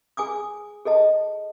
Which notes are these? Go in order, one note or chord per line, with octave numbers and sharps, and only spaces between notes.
G#4 G#5 D6 D#6
G#4 A4 D#5 A5